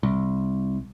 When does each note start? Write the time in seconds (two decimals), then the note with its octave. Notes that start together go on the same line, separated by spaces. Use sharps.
0.03 C2